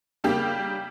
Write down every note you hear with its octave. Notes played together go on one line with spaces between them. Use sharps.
C#3 G3 A#3 G4